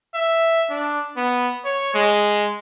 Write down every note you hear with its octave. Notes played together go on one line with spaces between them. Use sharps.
E5
D4
B3
C#5
G#3